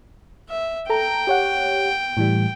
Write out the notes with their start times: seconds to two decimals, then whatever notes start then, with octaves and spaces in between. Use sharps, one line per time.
0.50 E5
0.90 A4 G5 A#5
1.27 G4 C#5 F#5
2.17 A2 E3 G3